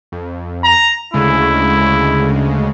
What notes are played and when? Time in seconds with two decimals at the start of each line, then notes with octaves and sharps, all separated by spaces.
0.12 F2
0.64 A#5
1.14 D2 C#3 G#3 E4